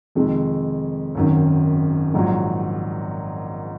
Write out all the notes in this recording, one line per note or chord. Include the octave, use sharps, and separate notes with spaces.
F2 C3 D#3 G#3
G#1 F#2 D#3
A#1 G#2 D#3 F#3